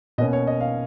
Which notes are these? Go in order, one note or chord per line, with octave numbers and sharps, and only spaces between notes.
B2 A#3 C#4 D#5
C#5
D#5
F5